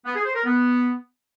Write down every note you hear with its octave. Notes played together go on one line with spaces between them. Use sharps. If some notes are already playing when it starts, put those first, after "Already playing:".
B3
G#4
C5
A#4
B3